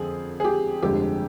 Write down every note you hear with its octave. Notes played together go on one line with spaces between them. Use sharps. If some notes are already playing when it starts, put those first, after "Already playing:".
Already playing: F2 D3 F3 C4 G#4
G#4
G4
G1 F2 D3 G#3 D4 G4